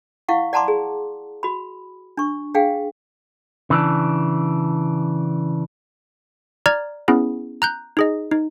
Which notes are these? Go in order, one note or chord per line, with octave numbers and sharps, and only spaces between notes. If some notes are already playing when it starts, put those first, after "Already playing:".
E4 F5 F#5 C#6
D5 F#5 A5 A#5 C6 D6
G#4
F#4 B5
D4 C#6
D4 G#4 F5 G5
C#3 E3 D4
D5 A#5 F6 G#6
B3 C#4 E4 G#4
A#5 F#6 G6
D#4 G#4 D#5
D#4